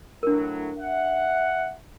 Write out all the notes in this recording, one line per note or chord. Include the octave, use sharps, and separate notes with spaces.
A2 F#3 D4 A#4
E5 F#5